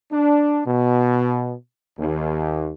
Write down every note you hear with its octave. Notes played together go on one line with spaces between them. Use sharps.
D4
B2
D#2